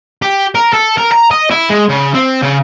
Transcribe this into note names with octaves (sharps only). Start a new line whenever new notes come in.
G4
A#4
A4
A#4
A#5
D#5
E4
G#3
C#3
C4
C#3